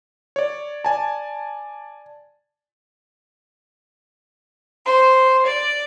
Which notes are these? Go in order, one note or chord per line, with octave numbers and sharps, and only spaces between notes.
C#5 D5
D5 G#5 A5
C5
D5